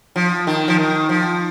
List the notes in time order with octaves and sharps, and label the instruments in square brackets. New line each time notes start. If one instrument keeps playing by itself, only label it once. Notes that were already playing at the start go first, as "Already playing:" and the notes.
[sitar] F3
D#3
F3
D#3
F3